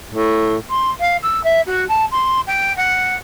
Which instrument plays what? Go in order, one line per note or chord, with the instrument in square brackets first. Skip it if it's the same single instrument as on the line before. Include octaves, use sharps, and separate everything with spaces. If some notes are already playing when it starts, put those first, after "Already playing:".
[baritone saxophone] A2
[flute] C6
F5
E6
E5
F#4
A5
C6
G5
F#5